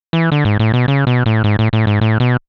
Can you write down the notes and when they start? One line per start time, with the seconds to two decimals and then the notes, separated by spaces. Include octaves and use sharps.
0.13 E3
0.32 D3
0.45 G#2
0.59 A2
0.74 B2
0.88 C#3
1.07 B2
1.26 A2
1.44 G#2
1.59 A2
1.73 A2
1.87 G#2
2.01 A2
2.20 B2